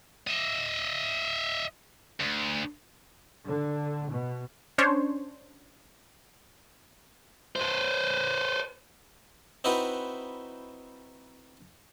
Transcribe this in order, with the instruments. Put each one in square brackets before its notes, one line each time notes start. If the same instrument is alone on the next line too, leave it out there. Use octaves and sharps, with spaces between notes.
[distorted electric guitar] D#5 E5
D2
[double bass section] D3
B2
[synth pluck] C#4 D4 C5 C#5
[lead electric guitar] B4 C5
[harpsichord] C4 D#4 E4 F#4 B4